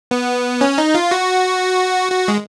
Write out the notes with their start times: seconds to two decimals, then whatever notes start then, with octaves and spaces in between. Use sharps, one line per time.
0.11 B3
0.61 C#4
0.78 D#4
0.94 F4
1.11 F#4
2.12 F#4
2.28 G#3